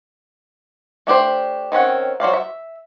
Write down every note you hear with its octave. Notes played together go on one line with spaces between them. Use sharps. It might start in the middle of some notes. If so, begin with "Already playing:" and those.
A3 D4 G4 C5
D#3 C4 C#4 F#5
F#3 C5 D5 F5
E5